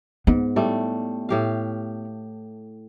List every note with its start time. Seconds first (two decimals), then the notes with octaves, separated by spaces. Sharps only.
0.27 G#2 B3
0.56 A2 G3 A3
1.29 A2 G4 F5